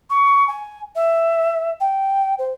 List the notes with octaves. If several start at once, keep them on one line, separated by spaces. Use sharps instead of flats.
C#6
G#5
E5
G5
C5